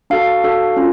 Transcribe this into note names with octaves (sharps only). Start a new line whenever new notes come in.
D4 F#4 A4 F5
D4 F#4 A4
C#4 F4